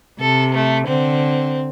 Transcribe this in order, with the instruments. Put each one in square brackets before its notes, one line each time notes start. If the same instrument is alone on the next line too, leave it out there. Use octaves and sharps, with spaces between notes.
[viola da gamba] C3 [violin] A4
[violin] A3
[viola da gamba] D3 [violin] C4